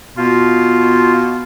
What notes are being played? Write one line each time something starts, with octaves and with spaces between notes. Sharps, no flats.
B2 F4